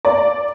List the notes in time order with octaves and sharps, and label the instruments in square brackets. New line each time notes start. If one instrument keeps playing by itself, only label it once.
[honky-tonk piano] D5